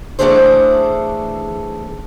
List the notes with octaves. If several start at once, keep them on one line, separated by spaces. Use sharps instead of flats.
E3 A3 D4 G#4 A4 C5